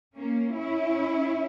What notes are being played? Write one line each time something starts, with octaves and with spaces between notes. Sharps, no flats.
A#3 C#4
C#4 E4